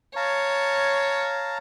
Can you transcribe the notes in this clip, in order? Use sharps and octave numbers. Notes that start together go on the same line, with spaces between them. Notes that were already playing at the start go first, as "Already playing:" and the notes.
C#5 F5 A5 A#5